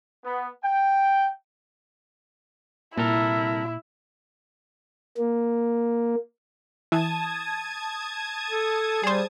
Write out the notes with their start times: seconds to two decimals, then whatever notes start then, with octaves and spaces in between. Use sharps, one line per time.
0.23 B3
0.63 G5
2.98 C2 A#2 E4 A4 A#4
5.17 A#3
6.92 E3 A5 D#6 G#6
8.51 A4
9.04 G3 G#4 C5